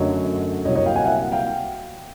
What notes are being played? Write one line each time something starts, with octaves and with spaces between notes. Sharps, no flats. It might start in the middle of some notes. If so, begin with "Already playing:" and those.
Already playing: F#2 D3 F#3 A3 C#5 D#5
C2 A#2 F#3 A#3 C#5 D#5
C#5 D#5
F5 G5
F#5 G#5
E5 F#5
F5 G5